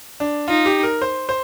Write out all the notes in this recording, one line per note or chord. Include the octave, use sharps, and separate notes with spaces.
D4
D#4 F4
G4
A#4
C5
C5